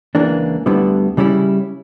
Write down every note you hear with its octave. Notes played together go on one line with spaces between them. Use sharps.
C#2 C#3 E3 A#3 D4
D2 D3 G3 B3 E4
C#3 G3 C#4 E4